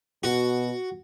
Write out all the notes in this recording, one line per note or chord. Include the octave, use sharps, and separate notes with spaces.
B2 F#4